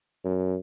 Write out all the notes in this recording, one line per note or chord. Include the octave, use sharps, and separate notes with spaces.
F#2